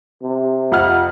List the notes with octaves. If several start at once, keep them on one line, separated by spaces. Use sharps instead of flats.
C3
F2 F#5 F6